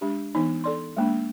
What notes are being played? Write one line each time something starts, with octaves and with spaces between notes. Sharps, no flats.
G#3 D4 G4
E3 B3 D#4
A4 D5 C6
G#3 A#3 D4